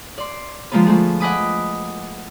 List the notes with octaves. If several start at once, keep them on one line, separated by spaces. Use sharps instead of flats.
D5 C6
D3 F3 G#3 A#3 B3 B4
F3 A3 G#4
D#5 F#5 G#5 B5 D6 D#6